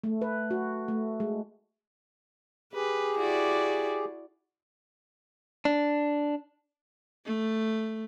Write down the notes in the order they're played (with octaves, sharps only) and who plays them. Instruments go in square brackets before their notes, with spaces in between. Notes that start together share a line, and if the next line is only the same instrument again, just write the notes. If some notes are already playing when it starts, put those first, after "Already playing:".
[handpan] A3
B4
F#4
A3
G#3
[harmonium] G4 G#4 [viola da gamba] B4
[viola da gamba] E4 F#4 D5
[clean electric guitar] D4
[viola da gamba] A3